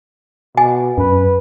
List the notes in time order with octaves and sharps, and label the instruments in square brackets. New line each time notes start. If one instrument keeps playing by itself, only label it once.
[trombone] B2 [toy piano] G#5
[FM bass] F#2 [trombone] B4